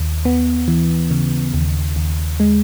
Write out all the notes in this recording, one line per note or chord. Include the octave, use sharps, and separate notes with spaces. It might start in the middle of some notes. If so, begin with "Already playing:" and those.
Already playing: D#2
B3
E3
C#3
D#2
D#2
G#3